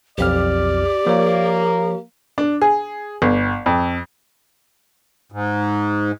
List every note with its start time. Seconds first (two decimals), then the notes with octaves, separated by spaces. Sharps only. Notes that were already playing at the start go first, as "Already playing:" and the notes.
0.18 B1 F2 G4 D5 F6
1.07 F3 A#3 C#5
2.38 D4
2.61 G#4
3.22 G1
3.66 F2
5.32 G#2